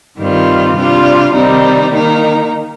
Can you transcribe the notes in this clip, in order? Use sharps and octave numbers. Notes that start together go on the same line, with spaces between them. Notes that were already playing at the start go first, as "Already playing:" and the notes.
G2 D#3 G3 C4 F4
C3 G3 D4 F4
C3 D#3 G3 C4 D#4
D#3 A#3 D#4